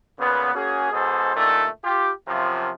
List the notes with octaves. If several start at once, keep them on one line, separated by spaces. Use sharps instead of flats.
A#2 C#3 B3
A#3 C#4 F#4 G#4
G#2 B2 G#4 A4 C5
G2 A#2 D#3 A3
F4 G4
F#2 C3 F3